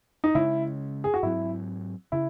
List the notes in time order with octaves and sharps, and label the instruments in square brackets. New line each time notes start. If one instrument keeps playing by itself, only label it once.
[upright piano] D#4
[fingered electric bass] C#3 G#3 C#4 [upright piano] E4
[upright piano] G#4
F#4
[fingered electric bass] G#2 F#3 C4 [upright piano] E4
[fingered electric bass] C#3 [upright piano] E4